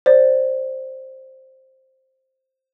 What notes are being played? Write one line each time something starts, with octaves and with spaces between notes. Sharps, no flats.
C5 D5